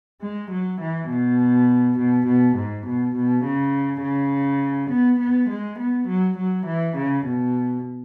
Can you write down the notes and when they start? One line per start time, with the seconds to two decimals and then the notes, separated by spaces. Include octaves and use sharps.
0.22 G#3
0.51 F#3
0.81 E3
1.09 B2
1.98 B2
2.27 B2
2.56 G#2
2.86 B2
3.15 B2
3.44 C#3
4.03 C#3
4.91 B3
5.20 B3
5.49 G#3
5.79 B3
6.08 F#3
6.38 F#3
6.66 E3
6.96 C#3
7.26 B2